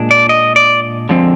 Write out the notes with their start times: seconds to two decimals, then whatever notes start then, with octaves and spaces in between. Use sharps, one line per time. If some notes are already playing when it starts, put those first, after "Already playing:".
Already playing: A#2 G#3 D4
0.11 D5
0.29 D#5
0.56 D5
1.09 D3 F3 G#3 C4